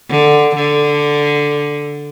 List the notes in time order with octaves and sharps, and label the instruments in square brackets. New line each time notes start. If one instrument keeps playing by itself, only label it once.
[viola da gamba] D3
D3